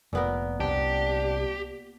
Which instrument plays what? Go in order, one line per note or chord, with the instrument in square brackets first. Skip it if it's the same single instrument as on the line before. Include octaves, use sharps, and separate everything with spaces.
[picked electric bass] F1 [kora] A#2 B3 A#4
[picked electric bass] C2 C3 [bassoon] D4 [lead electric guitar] G4